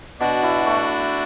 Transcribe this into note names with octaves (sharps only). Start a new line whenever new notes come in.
B2 D4 F#4
E4
A3